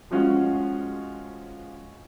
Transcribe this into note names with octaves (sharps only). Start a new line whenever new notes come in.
F3 G#3 C#4 F4 F#4